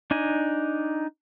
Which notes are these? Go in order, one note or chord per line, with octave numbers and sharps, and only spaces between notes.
D4 D#4 G#5